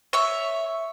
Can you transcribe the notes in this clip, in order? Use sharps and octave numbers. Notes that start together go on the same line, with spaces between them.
C#5 E5